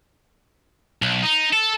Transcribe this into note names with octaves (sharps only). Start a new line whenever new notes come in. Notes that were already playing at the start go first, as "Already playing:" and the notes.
B1
D#4
A4